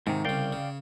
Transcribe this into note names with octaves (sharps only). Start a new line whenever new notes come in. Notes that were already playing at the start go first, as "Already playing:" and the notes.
G#2 C3 D#3
C2 C#3 D5 F5 G5
C#3